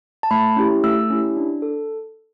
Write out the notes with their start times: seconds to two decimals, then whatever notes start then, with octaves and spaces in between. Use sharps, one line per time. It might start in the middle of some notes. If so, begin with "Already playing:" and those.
0.23 A5
0.31 A3 B5
0.57 C#4 E4 G4
0.84 A3 E6
1.10 C#4 E4 G4
1.37 D4
1.62 A4